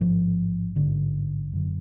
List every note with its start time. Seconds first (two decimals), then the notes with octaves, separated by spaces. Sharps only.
0.01 A1 G#2 F3
0.75 A1 G#2 D3
1.52 F#1 F#2 D3